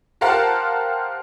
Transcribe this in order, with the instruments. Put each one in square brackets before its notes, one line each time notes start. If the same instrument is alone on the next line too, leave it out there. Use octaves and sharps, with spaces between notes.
[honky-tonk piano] G4 A#4 C5 F5 F#5 A5